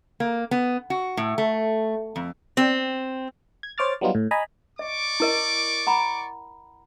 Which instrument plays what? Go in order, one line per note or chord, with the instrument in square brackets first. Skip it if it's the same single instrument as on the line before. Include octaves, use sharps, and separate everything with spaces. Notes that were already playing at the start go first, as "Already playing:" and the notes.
[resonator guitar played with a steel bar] A#3
B3
F#4
A2
A3
F2
C4
[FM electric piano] G#6
C5 C#5 D6 F6 A6
F#3 G3 B3 D#4 F4
A2
D#5 G#5 A#5 B5
[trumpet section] D5 C#6 D6 [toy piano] D#5
[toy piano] E4 A#4 D#5
F#5 A#5 B5